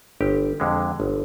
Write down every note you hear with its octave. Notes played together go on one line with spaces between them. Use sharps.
G1 G4
F2 D3 G#3
G1